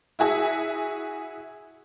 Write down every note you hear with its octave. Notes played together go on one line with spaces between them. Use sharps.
E4 F#4 G#4 E5